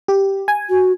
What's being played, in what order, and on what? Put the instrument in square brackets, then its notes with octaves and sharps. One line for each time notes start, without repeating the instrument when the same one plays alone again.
[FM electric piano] G4
G#5
[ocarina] F#4